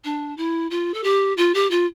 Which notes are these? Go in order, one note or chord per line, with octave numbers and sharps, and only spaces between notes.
D4
E4
F4
A4
G4
F4
G4
F4